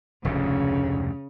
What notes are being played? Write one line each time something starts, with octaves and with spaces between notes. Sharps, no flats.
F1 D2 G#2 C#3